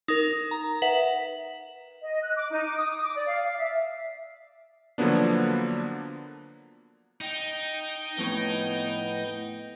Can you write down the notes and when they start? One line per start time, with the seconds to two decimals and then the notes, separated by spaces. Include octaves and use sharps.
0.08 D#4 A#4
0.51 A#5
0.82 B4 E5 F#5
2.03 D#5
2.23 F#6
2.35 D6
2.50 D#4
2.65 D6
2.77 D#6
2.92 D#6
3.03 D6
3.15 D5
3.27 F5
3.44 F5
3.57 E5
4.98 D3 F3 F#3 A#3 B3 D4
7.21 D#4 G5
8.18 F2 A2 B3